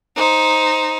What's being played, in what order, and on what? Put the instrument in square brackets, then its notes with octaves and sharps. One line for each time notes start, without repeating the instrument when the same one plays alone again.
[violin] D#4 C5